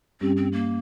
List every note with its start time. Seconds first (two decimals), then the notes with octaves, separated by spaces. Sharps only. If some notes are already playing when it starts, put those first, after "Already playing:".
0.21 G2 G3 C4 C#4 G4
0.37 C4
0.53 A#3